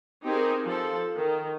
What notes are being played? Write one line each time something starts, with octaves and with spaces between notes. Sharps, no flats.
C4 D#4 G4 G#4 A#4
F3 A4
D#3